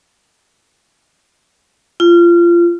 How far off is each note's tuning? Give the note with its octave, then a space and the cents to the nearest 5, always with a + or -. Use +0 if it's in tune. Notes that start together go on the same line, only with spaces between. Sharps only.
F4 -25